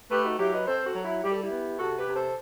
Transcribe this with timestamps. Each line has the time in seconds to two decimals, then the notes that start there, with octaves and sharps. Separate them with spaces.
0.10 A3 G4 B4
0.25 D#4 F#4
0.39 F#3 E4 G4
0.53 B4 D#5
0.67 C4 A4 C5
0.85 F#4 A4
0.95 F#3
1.04 E4
1.23 G3 G4
1.32 A4
1.42 E4 G4
1.50 B3
1.78 C3 F#4 A4
1.97 G4 B4
2.07 C3
2.16 A4 C5